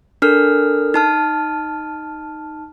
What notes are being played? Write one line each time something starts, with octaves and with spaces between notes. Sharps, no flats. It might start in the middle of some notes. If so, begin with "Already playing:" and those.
D4 A4 A#4 F6
D#4 A5 F6